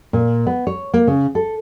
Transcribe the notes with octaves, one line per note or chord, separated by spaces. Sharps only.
A#2
B3
C#5
A#3
C#3
A4